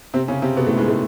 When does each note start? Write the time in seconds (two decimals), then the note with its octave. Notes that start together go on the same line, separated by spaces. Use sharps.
0.14 C3 C4
0.28 C#3 C#4
0.42 C3 C4
0.56 B2 B3
0.67 A2 A3
0.78 G#2 G#3
0.88 A2 A3